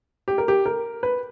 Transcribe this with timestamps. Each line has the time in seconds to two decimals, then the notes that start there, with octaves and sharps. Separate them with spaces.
0.28 G4
0.38 A#4
0.48 G4
0.66 A#4
1.03 B4